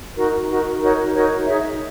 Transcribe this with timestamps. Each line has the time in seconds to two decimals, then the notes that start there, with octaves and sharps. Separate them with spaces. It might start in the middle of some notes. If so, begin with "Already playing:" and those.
0.16 D#4 F#4 A#4
0.48 D#4 F#4 A#4
0.81 D#4 F#4 A#4 C#5
1.14 D#4 F#4 A#4 C#5
1.46 D#4 G#4 C#5 E5